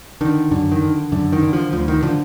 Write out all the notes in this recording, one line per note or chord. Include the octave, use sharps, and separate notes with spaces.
D3 D#3
F#2 D3
D#3
D3
F#2 D3
D#3
D3
F3
D2 F3
D#3
D3 F3